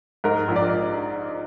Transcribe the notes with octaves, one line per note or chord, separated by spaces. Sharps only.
G#2 A#4
A#1
D5